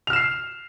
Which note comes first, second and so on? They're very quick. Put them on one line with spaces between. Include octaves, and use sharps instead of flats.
F7 F6 E7 C7